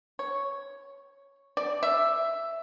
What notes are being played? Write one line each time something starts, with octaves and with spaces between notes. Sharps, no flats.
C#5
D5
E5